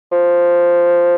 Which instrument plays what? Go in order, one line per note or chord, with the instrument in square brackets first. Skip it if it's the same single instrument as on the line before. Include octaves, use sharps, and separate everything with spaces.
[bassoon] F3